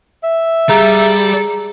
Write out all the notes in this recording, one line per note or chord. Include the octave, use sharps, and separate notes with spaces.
E5
G3 G#4 A4 A#5